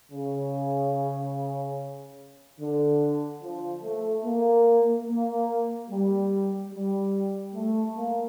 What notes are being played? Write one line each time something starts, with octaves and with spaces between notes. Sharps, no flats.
C#3
D3
F3
A3
A#3
A#3
G3
G3
A3
A#3